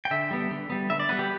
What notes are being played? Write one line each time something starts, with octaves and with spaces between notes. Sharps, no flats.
G5
D3 E5
G3 B3
D3
G3 B3
D3 E5
D5
G3 B3 B4
G4